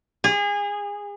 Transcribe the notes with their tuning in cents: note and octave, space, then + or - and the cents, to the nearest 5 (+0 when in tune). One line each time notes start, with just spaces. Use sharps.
G#4 -30